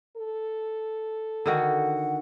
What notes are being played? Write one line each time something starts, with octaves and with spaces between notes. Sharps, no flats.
A4
D3 D#3 F#4 F#5